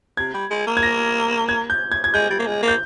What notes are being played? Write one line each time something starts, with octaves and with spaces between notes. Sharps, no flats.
C3 G#6
G3
G#3
A#3
G#6
A#6
G#6
G6
G#6
G#6
G#3 G6
G3
A#3
G#3
A#3
G6